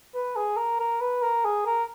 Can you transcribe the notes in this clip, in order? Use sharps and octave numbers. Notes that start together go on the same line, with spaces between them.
B4
G#4
A#4
A#4
B4
A#4
G#4
A#4